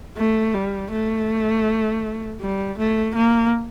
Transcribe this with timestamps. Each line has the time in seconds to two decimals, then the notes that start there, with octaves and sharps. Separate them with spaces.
0.17 A3
0.54 G3
0.91 A3
2.41 G3
2.78 A3
3.15 A#3